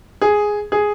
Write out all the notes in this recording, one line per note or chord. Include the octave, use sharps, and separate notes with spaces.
G#4
G#4